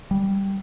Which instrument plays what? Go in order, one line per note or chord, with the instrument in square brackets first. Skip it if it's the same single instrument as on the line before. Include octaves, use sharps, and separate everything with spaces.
[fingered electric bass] G3